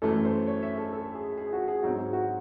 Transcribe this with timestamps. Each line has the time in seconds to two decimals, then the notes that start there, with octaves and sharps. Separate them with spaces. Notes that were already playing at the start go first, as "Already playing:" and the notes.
0.02 F#2 E3 A3 A4
0.25 C5
0.47 C#5
0.63 E5
0.77 A4
0.92 A4
1.15 G#4
1.38 G#4
1.53 F#4
1.68 G#4
1.83 G#2 F#3 C4 F#4
1.98 G#4
2.13 F#4